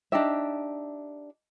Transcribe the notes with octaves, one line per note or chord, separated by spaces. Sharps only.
D4 D#4 G4 E5